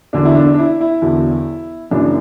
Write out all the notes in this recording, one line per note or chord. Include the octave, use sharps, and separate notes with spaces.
E1 E2 D3 F#3 D4
E4
D4
D4
E4
E4
E1 E2 D3 F#3
F#1 F#2 C#3 E3 D4